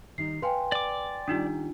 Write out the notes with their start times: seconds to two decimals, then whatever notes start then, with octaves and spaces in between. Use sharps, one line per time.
0.18 D#3 G3 D#4 C7
0.42 B4 F5 G5 G#5 C6
0.72 D5 D6
1.28 D#3 G3 D4 D#4 F4